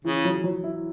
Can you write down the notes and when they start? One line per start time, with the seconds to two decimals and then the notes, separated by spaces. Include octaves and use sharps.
0.04 C#3 E3
0.25 F#3
0.44 F#3
0.64 E4